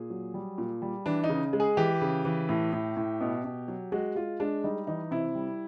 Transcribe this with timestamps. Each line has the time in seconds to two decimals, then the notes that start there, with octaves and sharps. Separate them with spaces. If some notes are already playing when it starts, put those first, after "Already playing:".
Already playing: A#2 G#4
0.10 F#3
0.34 G3
0.58 A#2
0.82 G3
1.06 E3 D4
1.24 D#4
1.29 C#3
1.53 G#3
1.60 G#4
1.77 E3 G4
2.01 C#3
2.25 E3
2.49 A2
2.73 A2
2.96 A2
3.21 B2
3.44 B2
3.68 F#3
3.92 G#3 F#4
4.15 G#3 F4
4.40 G#3 D4
4.64 G3 D#4
4.87 E3 D#4
5.11 C3 E4
5.35 G3